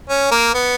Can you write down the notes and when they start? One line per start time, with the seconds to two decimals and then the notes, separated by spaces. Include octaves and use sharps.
0.09 C#4
0.31 A#3
0.54 B3